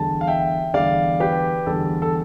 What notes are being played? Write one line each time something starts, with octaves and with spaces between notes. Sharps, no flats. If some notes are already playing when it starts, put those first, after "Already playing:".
Already playing: E2 D3 G3 A5
F5
E5 G5
E2 D3 G3 D5 F5
G4 B4
E2 D3 G3 A4
A4